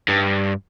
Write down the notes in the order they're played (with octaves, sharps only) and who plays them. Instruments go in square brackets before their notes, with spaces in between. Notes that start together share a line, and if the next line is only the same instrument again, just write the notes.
[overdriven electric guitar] G2